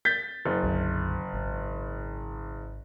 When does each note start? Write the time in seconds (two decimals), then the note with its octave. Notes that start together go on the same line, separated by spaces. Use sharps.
0.05 G6 A6 B6
0.46 F#1
0.63 B1 F#2 D3
1.33 G#1